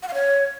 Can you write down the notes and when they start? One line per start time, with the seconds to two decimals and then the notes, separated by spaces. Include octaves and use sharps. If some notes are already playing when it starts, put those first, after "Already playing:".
0.03 F#5
0.08 F5
0.14 C#5